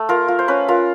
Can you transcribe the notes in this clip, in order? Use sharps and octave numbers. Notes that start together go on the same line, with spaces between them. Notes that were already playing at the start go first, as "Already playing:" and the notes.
Already playing: A3
F4 A#4
F4
C5
C#4 B4
F4 A#4